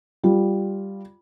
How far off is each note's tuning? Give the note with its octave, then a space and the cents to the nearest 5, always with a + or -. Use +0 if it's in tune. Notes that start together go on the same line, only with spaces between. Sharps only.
G3 +0 F4 +0